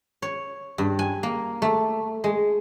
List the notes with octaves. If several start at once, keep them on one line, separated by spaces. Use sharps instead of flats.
C#5
G2
G#5
A#3
A3
G#3